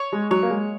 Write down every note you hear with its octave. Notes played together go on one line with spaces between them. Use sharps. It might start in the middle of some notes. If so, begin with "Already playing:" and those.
Already playing: C#5
G#3
F#3 C#5
A#3
G#3